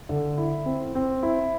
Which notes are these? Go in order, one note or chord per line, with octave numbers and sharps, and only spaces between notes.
D3
E4
C4
C4
E4